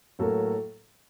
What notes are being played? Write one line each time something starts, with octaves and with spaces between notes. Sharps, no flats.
A2 F#3 A#3 A4